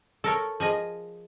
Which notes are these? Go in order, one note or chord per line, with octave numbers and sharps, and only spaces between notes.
A4 A#4 C#5
F3 G#4 D#5